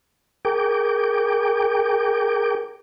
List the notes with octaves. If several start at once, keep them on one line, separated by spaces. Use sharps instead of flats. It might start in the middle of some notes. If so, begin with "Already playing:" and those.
G#4 A#4 G5 D6